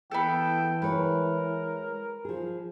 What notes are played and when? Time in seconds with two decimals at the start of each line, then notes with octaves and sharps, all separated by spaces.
0.11 E3 B3 A4 G5
0.82 G#3 A#4 B4 C#5
2.25 F3 G#4